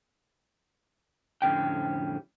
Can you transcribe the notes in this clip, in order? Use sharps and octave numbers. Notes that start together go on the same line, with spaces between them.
F2 A2 D3 C#4 G4 G5